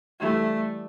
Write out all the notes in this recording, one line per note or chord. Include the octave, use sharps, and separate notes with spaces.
E3 G3 A3 D4 A4 E5